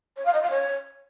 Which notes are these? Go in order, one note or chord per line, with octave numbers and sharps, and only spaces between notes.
C#5
F5
D#5
F5
C#5